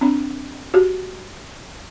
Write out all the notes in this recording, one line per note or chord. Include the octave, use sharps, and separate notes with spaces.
C4 D4
F#4 G4